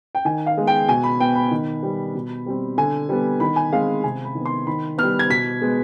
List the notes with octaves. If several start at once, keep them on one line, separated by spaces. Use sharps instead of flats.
G5
D#3 G#5
F5
G#3 B3
G5
B2 G#5
B5
B3 G5
B5
D#3
G3 B3
B2
G3 C4
D3 G#5
G3 B3
D#3 B5
G#5
G#3 C4 F5
C3 G#5
B5
D#3
B3
C6
D#3 B5
G3 B3 F6
G#6
B2 B6
G#3 B3